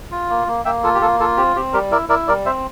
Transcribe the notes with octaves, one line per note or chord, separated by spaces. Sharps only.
F4
A#3
A#3
A#3 E5 G5
F4 A4
G4
A#3 A4
F4 A4
C4 G4
C4 G4
G3 G4 A#4
E4 A#4 D5
E4 A#4 D5
G3 A#4 D5
C4 C5 E5